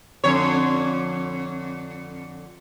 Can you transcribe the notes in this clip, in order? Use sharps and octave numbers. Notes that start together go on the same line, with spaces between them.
F2 D3 C#5